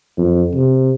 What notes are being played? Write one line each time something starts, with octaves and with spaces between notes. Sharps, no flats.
F2
C3